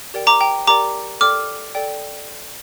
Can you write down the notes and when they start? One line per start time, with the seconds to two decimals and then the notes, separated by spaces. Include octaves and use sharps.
0.14 G4 A#4 D5 G5
0.27 A#5 D6
0.40 G5 A#5
0.67 G4 A#4 D5 G5 A#5 D6
1.21 A4 D5 G5 D6 F6
1.75 A4 D5 G5